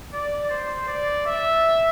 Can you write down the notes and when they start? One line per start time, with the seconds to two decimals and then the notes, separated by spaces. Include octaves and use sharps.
0.14 D5
0.50 C5
0.88 D5
1.26 E5